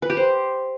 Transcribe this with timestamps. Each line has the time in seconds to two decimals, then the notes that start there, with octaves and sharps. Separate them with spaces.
0.02 B4
0.10 G4
0.17 C5